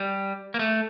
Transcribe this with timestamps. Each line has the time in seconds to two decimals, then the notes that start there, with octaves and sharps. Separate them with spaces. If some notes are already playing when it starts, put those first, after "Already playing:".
Already playing: G3
0.54 A#3
0.59 A3